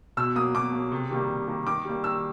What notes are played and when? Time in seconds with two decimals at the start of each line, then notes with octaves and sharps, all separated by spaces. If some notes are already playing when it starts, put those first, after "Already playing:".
0.17 B2 E6
0.35 F#3 A#3 D#6
0.55 B2 D6
0.73 F#3 A#3
0.92 C3
1.10 D#3 G3 A#3
1.29 C3
1.48 D#3 G3 A#3
1.66 D#3 D6
1.85 G3 A#3
2.04 D#3 E6